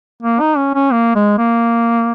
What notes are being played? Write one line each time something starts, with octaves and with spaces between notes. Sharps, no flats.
A#3
D#4
C#4
C#4
A#3
G#3
A#3